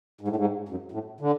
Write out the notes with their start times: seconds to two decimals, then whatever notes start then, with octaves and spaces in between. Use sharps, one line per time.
0.21 G#2
0.28 A2
0.36 G#2
0.69 F#2
0.92 A2
1.20 D3